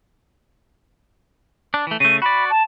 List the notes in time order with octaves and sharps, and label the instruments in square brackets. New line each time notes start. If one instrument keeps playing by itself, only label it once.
[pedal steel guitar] D4
E3 A3
[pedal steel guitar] C#3 A3 [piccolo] D#7
[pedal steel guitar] F#4 D5 [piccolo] B5
[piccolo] A5